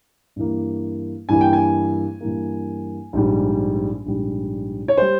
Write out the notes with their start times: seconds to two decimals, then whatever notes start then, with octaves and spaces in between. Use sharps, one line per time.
0.36 G2 E3 A#3
1.29 G2 E3 A#3 G#5
1.41 G5
1.53 G#5
2.21 G2 E3 A#3
3.13 A#1 G#2 G3
4.06 A#1 G#2 G3
4.88 C#5
4.98 G3 C5